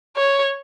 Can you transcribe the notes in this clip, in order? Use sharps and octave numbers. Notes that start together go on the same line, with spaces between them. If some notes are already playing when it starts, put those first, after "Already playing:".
C#5